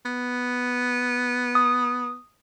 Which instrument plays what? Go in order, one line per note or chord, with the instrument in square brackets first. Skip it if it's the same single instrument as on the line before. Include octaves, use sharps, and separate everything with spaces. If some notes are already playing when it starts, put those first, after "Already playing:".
[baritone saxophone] B3
[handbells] D#6